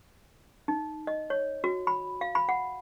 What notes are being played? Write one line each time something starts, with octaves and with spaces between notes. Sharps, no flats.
D#4
D#5
C#5
F#4
B5
F5
B5
F#5